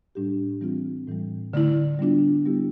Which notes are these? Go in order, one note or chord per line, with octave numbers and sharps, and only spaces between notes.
A2 G3 D4 G4
E3 G3 C4 F4
A2 E3 G3
D3 A3 E4
G3 B3 D4 F4
G3 B3 E4 G4